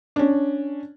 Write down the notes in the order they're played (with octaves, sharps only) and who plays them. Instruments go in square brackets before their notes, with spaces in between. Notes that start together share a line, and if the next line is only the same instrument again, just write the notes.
[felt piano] C#4 D4